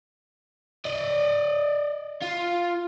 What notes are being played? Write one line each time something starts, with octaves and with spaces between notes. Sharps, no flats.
D5 D#5
F4